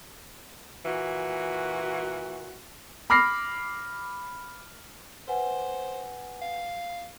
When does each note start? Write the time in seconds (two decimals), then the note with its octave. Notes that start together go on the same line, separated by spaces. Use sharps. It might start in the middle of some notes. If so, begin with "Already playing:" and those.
0.85 A#2 E3 F#4
3.10 B5 D6 F6 A#6 C7
5.28 B4 C5 F#5 G#5
6.42 F5